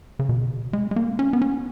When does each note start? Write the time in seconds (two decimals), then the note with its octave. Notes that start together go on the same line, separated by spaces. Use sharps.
0.19 C#3
0.29 B2
0.73 G#3
0.91 G#3
0.96 A#3
1.19 C#4
1.33 B3
1.42 C#4